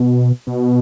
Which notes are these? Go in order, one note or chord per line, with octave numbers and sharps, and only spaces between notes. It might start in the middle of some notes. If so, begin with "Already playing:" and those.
Already playing: B2
B2